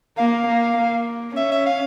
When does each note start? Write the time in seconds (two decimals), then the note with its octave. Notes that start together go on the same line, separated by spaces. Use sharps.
0.18 A#3 F5
0.48 A#3
0.77 A#3
1.36 C#4 E5
1.51 E5
1.66 F5